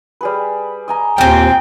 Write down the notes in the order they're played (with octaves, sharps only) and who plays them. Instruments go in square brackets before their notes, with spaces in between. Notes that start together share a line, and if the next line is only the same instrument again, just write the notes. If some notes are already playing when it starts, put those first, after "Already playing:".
[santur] G3 G#4 B4
D#5 G#5 A#5
[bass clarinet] D#2 [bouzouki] A#2 C4 [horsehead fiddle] G5